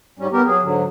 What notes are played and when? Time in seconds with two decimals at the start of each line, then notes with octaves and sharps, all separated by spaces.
0.19 G#2 G3 C#4
0.32 B3 G4 A#4
0.46 F#3 G#4
0.63 G#2 D3 F#3